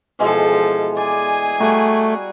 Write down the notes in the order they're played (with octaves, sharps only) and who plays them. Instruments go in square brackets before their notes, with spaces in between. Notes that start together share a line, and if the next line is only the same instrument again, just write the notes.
[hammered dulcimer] B2 E3 G#3 [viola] F3 A4
[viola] G#4 G#5 [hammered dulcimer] D5
[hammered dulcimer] G3 F#4 A#5 [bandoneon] A3